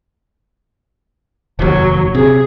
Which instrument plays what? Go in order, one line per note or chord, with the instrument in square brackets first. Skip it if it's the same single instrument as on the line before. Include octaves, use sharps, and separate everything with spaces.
[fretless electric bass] F1 D#2 [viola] F#3
[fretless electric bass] C3 [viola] G#4